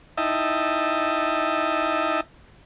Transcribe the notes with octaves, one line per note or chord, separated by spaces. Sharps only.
D#4 E4 D#5 E5 G5 A5